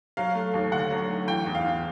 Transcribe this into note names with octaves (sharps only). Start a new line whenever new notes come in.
F#3 F5
A3
D#2
D3 F#5
F#3
A3
E3 G5
E2
F5
E2